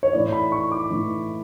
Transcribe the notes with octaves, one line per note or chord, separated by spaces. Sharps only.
C#5
A2 E3 A3 E4 D5
B5
C#6
D6
A2 E3 A3 E4